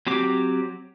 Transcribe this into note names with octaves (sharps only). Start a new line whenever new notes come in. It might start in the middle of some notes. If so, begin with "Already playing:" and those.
F#3 C4 G4 D6